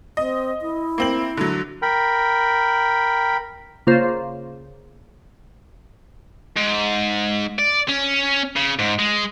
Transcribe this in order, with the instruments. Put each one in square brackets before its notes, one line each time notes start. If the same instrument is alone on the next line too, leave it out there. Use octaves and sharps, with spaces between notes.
[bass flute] C4 [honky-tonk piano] D#5
[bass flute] E4
[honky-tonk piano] A#3 C4 F#7
D3 F#3
[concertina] A#4 G5 B5
[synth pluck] C#3 A#3 F4 C5
[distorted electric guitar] G#2
D5
C#4
C#3
G#2
G#3